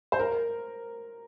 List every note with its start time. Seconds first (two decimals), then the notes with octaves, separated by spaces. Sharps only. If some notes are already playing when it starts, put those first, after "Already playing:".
0.12 C5
0.20 A#4